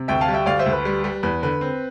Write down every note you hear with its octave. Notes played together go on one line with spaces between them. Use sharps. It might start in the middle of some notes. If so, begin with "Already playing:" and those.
Already playing: C3
D2 E5 G5
F5 A5
G3
E5 G5
D2 D5 F5
C5 E5
D2
B4
G3
G3
E2 B4
D3 B4
C4